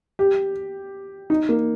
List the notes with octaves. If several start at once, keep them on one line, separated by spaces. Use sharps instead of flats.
G4
D#4
A#3